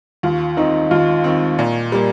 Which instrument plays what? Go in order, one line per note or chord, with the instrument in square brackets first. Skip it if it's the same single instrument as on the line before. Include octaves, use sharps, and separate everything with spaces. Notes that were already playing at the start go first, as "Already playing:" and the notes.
[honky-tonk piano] D#2 [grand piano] F4
[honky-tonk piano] D#3 C4 [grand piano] D#4
[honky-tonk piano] D#2 [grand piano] F4
[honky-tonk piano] D#3 C4
A#2
G3 A#3